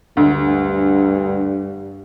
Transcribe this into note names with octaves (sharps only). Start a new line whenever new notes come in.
D2 G2